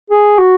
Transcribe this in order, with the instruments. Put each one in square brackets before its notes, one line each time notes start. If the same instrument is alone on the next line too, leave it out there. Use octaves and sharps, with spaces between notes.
[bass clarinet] G#4
F#4